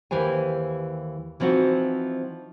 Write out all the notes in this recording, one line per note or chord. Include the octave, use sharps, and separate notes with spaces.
D#2 E3 G4 C5 G#5
E3 F3 C4 D#4 F#4